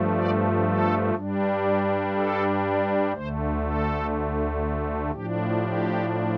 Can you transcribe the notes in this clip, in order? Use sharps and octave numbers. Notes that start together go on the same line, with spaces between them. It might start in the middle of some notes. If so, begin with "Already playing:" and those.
Already playing: G2 F3 A3
D5
A4
G2 G3 D4
G4
A4
D2 D3 A3 C5
A4
A2 F3 D4 G4
G4